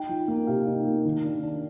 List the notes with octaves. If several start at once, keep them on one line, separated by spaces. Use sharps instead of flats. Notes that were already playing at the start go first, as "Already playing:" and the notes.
Already playing: D#4 G5
F3
A#3
C3 F5
D#4
A#3
D#3
D4
D4